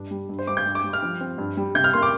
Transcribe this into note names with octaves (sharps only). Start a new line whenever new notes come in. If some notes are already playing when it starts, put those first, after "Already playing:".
Already playing: G2 D4
G3
G2
C5
G3 D6
G6
G2
D6
G3
F6
F3
C4
G2
G3
C3 G6
F6
A#3 C6
D6